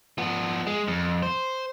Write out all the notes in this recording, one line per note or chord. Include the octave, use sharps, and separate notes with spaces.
F3 B3
G#3
F2
C5